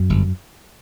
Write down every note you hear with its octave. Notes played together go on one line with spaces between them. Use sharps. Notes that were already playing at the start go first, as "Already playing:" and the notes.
Already playing: F#2
G1